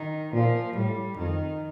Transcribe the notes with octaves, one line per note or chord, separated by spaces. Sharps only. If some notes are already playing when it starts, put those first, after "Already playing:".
Already playing: D#3
A#2 F3
A2 G3
F2 D#3